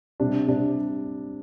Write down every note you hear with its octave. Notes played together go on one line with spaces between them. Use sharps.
C3 G3 D4
C3 G3 D4